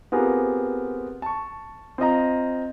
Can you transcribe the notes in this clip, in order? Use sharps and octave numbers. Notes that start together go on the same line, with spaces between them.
B3 C4 F4 G4 G#4 A#4
A5 C#6
C4 F4 D#5 A#5